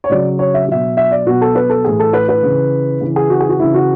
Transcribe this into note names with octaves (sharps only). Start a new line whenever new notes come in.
C#5
C#3 F#3 D5
C#5
E5
B2 F#3 E5
E5
D5
B2 F#3 F#4
A4
B4
A4
A2 E3 G#4
A4
B4
B4
C#3 E3
C#3 E3
G#4
F#4
G#4
F#4
C#3 E3 E4
F#4